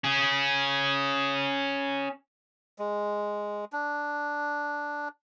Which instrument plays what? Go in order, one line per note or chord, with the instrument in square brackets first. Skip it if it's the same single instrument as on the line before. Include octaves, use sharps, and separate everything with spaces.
[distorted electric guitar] C#4 G#4
[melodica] G#3
D4